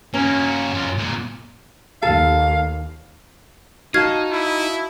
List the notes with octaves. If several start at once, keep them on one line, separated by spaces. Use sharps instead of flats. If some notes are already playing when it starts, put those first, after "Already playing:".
A#3 C#4 F#4
F#2 F4
A#2 G#3
D#2 A4 F5
D#4 F#4 F5 A5 F6 G#6 C7
E4